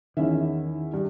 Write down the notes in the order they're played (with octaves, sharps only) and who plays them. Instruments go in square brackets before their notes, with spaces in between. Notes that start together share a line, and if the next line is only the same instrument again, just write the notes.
[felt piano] E2 C#4 E5 [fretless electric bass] D#3
[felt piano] G2